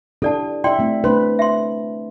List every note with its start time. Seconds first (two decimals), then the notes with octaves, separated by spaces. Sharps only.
0.22 D4 E4 G4 A4 D5 A5
0.64 E4 D5 E5 G5 C6
0.79 A3 C4
1.04 A3 D4 B4 C5 C6
1.39 E5 C6